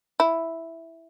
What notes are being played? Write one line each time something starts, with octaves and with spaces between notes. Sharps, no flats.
E4